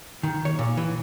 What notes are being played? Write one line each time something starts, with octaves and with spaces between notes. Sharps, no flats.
D#3
C#5
A#2
E3